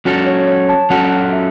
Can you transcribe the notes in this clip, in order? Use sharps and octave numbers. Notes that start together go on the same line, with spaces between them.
F#3 C#4 F#4 A4
C#5
C#5
A5
F#3 C#4 F#4 A4 F#5
E5